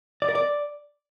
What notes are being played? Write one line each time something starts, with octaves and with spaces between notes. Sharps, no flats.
D5
A#4
D5